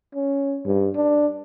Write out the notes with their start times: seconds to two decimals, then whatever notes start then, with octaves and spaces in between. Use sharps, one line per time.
0.15 C#4
0.66 G2
0.96 D4